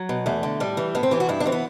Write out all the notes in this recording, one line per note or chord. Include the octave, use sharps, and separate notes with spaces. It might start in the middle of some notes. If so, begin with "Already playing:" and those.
Already playing: F#3
B2
E2 A3
D3
A2 G3
E3
A2 B3
C4
E3 G4
F#4
G2 E4
D4
E3 C4
B3